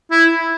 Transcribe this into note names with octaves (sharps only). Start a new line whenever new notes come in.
E4